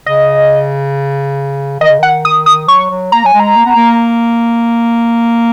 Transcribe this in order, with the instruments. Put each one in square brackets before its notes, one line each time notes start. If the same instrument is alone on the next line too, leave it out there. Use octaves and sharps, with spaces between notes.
[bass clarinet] C#3 [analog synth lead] D#5
[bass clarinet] D#3 [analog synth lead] D#5
[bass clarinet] C#3
[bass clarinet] D#3 [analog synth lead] F#5
[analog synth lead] D#6
D#6
[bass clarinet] F#3 [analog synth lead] C#6
[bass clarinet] F#3
[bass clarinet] A#3 [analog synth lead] A#5
[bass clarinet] F#3 [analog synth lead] G#5
[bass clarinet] G#3
[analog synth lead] A#5
[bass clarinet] A#3
B3
A#3